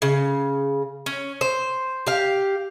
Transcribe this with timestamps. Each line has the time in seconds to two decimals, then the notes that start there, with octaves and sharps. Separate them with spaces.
0.02 C#3
1.06 C#4
1.41 C5
2.07 G4 F5